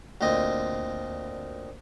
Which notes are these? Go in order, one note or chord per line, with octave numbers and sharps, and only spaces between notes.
D2 A#2 C4 D#5